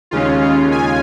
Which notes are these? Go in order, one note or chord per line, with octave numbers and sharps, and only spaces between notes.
D#2 C#3 G#3 C#4 F4
F4
G#5